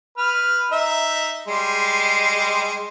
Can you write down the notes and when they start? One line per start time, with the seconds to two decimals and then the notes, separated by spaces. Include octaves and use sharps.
0.18 B4 F6
0.71 D#4 E5
1.48 G3 G#3 C6